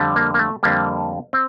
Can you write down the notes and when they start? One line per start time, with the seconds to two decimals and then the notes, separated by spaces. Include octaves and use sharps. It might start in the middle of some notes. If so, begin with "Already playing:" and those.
Already playing: F2 D3 G3
0.16 A#3
0.34 A#3
0.39 A3
0.63 F2 D3 G3 A#3
1.33 C4